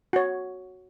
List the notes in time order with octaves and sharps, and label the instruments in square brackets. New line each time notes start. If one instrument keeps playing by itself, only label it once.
[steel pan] F#4 C#5